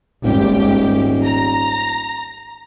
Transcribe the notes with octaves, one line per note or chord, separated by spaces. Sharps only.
D#1 G#1 G4
A#5